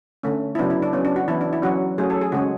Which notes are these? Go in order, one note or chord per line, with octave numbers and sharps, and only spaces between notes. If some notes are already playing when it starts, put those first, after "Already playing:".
D3 A3 C#4
E4
C#3 F#3 B3 D4
E4
D4
F#3 B3 C#4
D4
F#4
E3 B3 E4
D4
E4
F#3 C#4 F#4
F#3 A3 C#4 G#4
A4
G#4
C#3 G#3 C#4 F#4